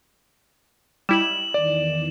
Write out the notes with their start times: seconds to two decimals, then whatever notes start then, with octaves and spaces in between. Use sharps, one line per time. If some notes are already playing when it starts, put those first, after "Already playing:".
1.09 G3 E4 D#5 E7 F#7
1.54 E2 D#3 E3 D5